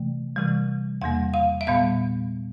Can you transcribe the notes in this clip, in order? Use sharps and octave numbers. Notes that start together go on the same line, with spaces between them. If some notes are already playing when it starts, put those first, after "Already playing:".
Already playing: C3 E3 A3
C3 E3 G3
E2 B2 G3 A#3 F#5
F5
E5
A#2 G3 B3 F5